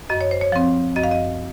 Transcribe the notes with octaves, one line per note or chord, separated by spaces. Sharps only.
F#2 D#5
C#5
C5
C#5
F3 C4
F#2 D#5
F5
D#5